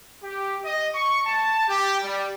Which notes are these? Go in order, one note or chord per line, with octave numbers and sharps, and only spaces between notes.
G4
D#5
C#6
A5
G4
G3